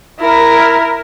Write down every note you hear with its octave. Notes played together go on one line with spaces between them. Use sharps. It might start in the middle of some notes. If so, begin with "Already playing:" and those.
E4 A#4